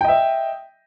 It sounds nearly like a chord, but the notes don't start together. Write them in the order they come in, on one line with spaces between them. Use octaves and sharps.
G5 D#5 E5